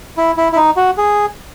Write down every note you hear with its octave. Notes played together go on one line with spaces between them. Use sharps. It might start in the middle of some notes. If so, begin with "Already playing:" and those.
E4
E4
E4
D#4
F#4
G#4